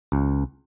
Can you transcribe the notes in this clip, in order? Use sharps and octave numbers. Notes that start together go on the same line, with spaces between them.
C#2